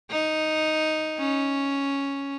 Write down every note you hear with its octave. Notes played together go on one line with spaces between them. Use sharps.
D#4
C#4